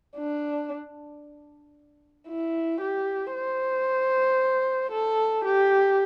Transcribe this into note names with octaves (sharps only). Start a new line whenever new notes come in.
D4
E4
G4
C5
A4
G4